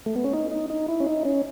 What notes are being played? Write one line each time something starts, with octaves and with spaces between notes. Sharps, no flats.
A3
B3
C#4
D#4
D#4
D#4
E4
C#4
D#4
C#4